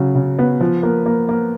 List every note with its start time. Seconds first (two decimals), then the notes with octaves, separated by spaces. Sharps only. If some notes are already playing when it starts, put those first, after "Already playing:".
Already playing: C#3 F#3
0.15 C#3
0.39 B3
0.61 F3
0.83 A#3
1.06 A#3
1.29 A#3